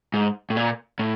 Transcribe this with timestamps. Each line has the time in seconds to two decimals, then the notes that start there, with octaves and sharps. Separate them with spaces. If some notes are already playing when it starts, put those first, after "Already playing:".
0.14 G#2
0.50 A2
0.57 A#2
0.99 A2